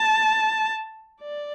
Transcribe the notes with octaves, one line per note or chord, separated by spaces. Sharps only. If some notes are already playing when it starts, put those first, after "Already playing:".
Already playing: A5
D5